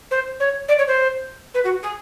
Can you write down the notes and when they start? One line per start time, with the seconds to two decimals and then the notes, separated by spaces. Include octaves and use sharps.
0.11 C5
0.40 C#5
0.68 D5
0.78 C#5
0.87 C5
1.54 B4
1.64 F#4
1.83 G#4